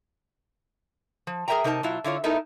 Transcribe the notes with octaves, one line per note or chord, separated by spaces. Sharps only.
F3
G#4 A#4 C#5 E5 G5 A#5
C3 D#4 A#4 B4 A5
B2 F#3 E4 F4
D3 E4 F4 C#5
A3 B3 D#4 E4 A4 A#4